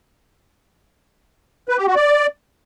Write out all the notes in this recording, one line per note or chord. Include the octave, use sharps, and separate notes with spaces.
B4
G4
F#4
D5